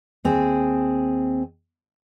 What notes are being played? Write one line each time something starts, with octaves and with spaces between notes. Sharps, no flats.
D#2 C4 G#4